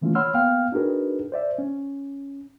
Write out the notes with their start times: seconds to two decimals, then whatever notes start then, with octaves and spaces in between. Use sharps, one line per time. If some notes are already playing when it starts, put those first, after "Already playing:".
0.01 D#3 E3 A3 A#3 C#4 F4
0.15 C#5 F#5 B5 C6 E6 F6
0.34 A#3 B3 F5 G5 F6
0.72 D4 D#4 F#4 G#4 A#4 B4
1.32 C5 D5 E5
1.58 C#4